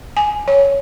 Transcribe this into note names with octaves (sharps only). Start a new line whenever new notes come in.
G#5
C#5